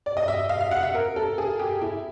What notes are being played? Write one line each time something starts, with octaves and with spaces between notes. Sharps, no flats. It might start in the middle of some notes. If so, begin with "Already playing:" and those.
D5
D#5
E5
F5
F5
F#5
E5
A#4
A4
G#4
G4
E4